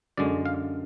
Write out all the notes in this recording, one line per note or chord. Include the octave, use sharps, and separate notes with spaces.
F#2 D3 G#3 D5
F5